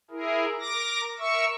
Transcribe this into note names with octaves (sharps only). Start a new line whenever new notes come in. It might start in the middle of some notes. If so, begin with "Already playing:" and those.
E4 G#4 A#4
A#4 D6 A#6
A#4 E5 C#6 E6